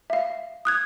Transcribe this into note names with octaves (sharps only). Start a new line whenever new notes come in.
E5 F5
D#6 F#6 G#6